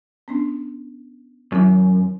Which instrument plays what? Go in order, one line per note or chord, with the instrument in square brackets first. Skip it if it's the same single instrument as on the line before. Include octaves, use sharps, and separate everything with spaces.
[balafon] B3 C#4 D4
[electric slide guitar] F#2 [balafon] D#3 F#3 E4